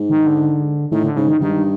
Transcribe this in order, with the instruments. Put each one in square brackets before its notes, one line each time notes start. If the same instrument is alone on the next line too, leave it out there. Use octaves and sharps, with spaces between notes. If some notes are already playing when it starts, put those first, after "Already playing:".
Already playing: [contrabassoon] G#2
[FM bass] D#3
D3
[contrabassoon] A2 [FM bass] D#3
[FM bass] D3
[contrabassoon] G#2 [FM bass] C#3
[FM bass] D#3
[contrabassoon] G2 [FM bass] D#3